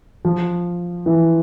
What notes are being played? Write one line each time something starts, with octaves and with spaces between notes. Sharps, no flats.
F3
E3